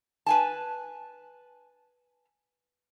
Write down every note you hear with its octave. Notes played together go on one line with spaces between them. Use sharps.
B4 G#5 A5